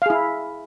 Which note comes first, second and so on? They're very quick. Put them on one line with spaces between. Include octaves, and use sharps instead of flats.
F5 G#4 E4